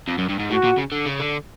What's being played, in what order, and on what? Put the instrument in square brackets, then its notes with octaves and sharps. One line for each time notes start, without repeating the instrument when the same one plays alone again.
[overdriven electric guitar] F2
F#2
G2
G#2
[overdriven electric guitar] A2 [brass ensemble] F#4
[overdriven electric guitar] A#2
C#3
D3
C#3
D3